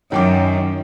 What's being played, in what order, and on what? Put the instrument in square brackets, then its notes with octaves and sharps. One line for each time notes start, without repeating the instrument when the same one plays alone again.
[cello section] F#2 [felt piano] D#3 G5 D6 [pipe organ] C#4 D#4